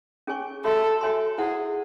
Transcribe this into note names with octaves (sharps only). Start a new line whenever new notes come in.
C#4 G#4 C#5 G#5 C#6
F#4 A4 C#5 E5 C6
F#4 C#5 E5 G#5 C6
E4 G#4 C5 F#5